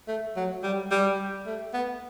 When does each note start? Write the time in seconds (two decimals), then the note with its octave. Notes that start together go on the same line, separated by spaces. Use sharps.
0.08 A3
0.36 F#3
0.64 G3
0.91 G3
1.46 A3
1.74 B3